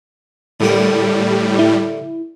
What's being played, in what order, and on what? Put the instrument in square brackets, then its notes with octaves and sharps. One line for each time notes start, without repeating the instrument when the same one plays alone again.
[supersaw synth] A2 G3 [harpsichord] D3 A#4
[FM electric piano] E4